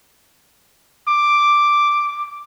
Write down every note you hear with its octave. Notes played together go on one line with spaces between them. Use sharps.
D6